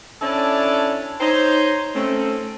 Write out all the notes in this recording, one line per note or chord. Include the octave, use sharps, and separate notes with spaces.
C#4 D4 E4 A4 C#5 D5
D#4 C5 C#5
A3 C4 C#4